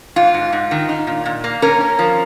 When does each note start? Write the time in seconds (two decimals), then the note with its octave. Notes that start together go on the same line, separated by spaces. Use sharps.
0.16 G#2 F4
0.34 G#2
0.52 G#2
0.71 D#3
0.89 D#4
1.07 A#2
1.26 A#2
1.44 A#3
1.62 C#4 A#4
1.81 C#4
1.99 F3